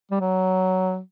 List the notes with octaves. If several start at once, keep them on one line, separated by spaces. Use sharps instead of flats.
G3
F#3